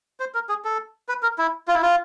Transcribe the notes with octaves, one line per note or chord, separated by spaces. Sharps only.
C5
A#4
G#4
A4
B4
A#4
E4
F4
E4
F4